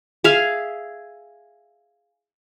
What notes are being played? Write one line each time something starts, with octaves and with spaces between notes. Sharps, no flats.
G#4 E5 F5